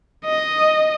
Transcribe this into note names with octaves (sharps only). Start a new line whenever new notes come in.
D#5